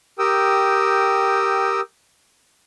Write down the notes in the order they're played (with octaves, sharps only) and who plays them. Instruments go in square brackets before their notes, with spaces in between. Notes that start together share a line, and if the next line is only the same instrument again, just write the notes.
[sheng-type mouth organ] G4 A#4 G5 D#6 E6